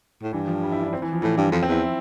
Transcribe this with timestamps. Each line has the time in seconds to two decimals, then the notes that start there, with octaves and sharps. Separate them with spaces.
0.22 A2
0.33 G2 E3
0.47 F3
0.63 G3
0.72 E4
0.83 D4
0.93 C4
1.02 E3
1.13 F3
1.22 A2 E3
1.37 G2
1.52 F2 F3
1.63 C4
1.68 E2 E4